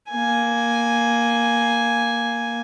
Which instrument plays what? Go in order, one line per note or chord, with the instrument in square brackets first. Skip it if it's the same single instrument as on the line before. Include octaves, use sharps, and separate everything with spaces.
[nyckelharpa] A#3 G#5